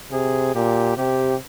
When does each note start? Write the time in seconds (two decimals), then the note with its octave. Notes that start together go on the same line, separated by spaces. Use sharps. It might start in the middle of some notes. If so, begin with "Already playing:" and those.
0.11 C3 G#4
0.55 A#2 G4
0.97 C3 G4